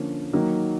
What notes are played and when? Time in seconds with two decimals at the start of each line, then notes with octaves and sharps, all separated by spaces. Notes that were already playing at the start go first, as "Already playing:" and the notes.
Already playing: D3 F3 A#3 C#4
0.33 D#3 F#3 A#3